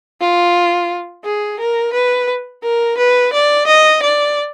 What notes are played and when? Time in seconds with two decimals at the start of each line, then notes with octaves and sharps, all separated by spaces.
0.20 F4
1.24 G#4
1.59 A#4
1.93 B4
2.63 A#4
2.97 B4
3.33 D5
3.67 D#5
4.02 D5